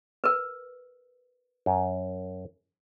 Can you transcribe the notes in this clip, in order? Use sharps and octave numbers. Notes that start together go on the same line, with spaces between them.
A#4 B4
F#2